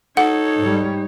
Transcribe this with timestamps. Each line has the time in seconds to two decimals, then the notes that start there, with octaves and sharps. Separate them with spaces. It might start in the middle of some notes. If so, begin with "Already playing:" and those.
0.17 D#4 A4 C#5 F#5
0.58 G#2 G3